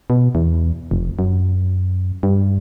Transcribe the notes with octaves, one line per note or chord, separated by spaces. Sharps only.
B2
E2
F1
F#2
G2